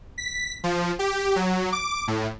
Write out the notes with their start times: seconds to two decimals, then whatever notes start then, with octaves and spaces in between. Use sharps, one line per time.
0.18 B6
0.64 F3
0.99 G4
1.36 F#3
1.72 D6
2.08 A2